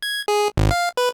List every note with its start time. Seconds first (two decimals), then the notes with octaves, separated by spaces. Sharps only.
0.02 G#6
0.28 G#4
0.57 G#1
0.71 F5
0.97 B4